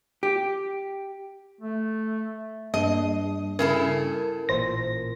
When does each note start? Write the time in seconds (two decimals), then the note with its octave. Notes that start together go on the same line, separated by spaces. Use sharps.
0.23 G4
1.61 A3
2.74 G2 A#3 D#5
3.59 C#3 E4 A4 A#4
4.49 A1 A#2 C5 A#6